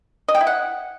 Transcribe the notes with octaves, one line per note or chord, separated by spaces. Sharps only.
D#5
G5
E4
F#5